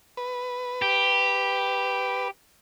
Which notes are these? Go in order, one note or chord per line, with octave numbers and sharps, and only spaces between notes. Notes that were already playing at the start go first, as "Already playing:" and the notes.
B4
G4